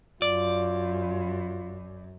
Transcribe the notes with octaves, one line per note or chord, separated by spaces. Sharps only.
F#2 F4 D5